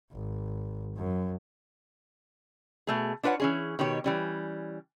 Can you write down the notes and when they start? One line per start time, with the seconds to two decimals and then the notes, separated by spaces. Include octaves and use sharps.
0.12 G#1
0.96 F#2
2.87 B2 A3 G#4
3.23 D4 F4 B4 C#5 F#5
3.40 E3 C#4 G#4
3.79 B2 D#3 G4 C#5
4.04 E3 G3 C#4